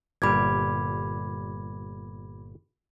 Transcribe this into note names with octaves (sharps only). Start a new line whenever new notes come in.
G1 A#2 G3 B5 D6 G#6